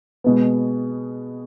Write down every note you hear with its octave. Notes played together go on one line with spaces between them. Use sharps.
B2 G#3 B3